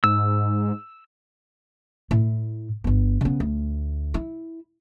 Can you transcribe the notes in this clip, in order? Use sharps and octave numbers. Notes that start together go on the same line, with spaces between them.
G#2 E6
A2 E4
G1 B3
C#3 B3
D2
E4